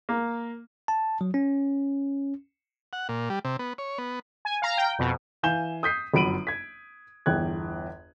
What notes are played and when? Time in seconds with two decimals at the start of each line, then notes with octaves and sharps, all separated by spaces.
0.09 A#3
0.88 A5
1.21 F#3
1.34 C#4
2.93 F#5
3.09 A#2
3.30 G3
3.45 C3
3.59 B3
3.78 C#5
3.98 B3
4.45 G#5
4.62 F5 A#5
4.77 G5
4.99 F2 B2
5.43 E3 F5 G#5 G6 E7 G7
5.83 D#6 G6 B6 C7
6.14 G1 F#2 B5 D7 D#7 F#7
6.47 G#6 B6
7.26 G1 E2 G5 F#6 G#6